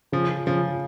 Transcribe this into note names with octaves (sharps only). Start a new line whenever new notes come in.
C#3 F3
C#3 F3